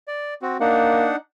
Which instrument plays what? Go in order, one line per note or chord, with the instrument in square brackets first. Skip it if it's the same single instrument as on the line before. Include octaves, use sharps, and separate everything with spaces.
[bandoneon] D5
C4 F#4
[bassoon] A#3 [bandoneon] D4 D#4 F#5